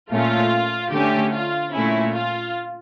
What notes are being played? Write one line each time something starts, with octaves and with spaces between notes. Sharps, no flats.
A#2 A3 C#4 F4
D3 A3 C#4 G4
F4
A#2 A3 C#4 E4
F4